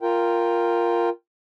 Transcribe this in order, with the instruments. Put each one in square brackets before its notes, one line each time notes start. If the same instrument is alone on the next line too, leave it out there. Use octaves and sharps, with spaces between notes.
[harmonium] F4 A#4 G5